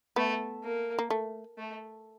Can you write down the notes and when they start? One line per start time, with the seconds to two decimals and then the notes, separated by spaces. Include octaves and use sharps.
0.16 A3 B3
0.64 A#3
0.99 A#3
1.10 A3
1.58 A3